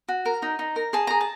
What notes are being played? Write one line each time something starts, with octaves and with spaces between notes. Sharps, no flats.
F#4
A#4
D#4
D#4
A#4
G#4 A5
G#4 A#5
A5